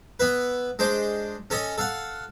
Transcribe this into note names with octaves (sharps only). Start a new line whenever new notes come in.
B3 E4 B4
G#3 D4 C5 D6
C#4 A4 C#5 D#5 G#5
A4 F5 F#5